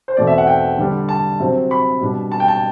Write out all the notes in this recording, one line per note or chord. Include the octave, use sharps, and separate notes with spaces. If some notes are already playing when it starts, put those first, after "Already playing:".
C5
E2 B2 A3 C4 D5
E5
F#5
G5
D3 G3 D4
A5
C3 F#3 C4
B5
B2 G3 D4
A5
G5
A5